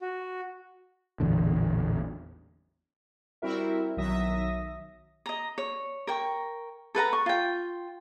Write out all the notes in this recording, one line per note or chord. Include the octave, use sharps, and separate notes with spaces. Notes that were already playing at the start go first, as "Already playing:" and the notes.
F#4
A1 E2 A#2 D3
G3 C4 E4 F#4 A#4 E5
B1 D#3 F#3 E5 D#6 A#6
D#5 A#5
C#5
A#4 G5 C#6
A4 B4 F#5 A#5
C#6
F4 G5